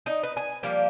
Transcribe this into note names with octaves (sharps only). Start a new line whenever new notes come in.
D#4 D#5
B4
G#5
F3 G3 A#3